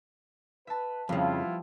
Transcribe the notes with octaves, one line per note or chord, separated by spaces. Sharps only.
B4 E5 A5
F2 C#3 F3 G3 B3 E4 F4